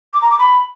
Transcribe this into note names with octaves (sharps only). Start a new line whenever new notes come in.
D6
A#5
D6
B5